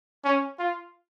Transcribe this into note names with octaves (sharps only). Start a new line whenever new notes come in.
C#4
F4